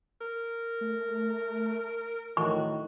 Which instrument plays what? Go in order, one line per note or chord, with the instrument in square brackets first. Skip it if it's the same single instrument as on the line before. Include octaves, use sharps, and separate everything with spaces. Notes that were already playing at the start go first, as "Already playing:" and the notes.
[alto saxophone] A#4
[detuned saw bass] A3
[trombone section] D2 A2 D#3 [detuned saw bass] E3 [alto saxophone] F#4 [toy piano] C#6